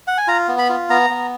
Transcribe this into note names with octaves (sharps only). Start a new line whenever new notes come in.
F#5
G#5
F4 A#5
B3
B5
F4
B3 A#5
B3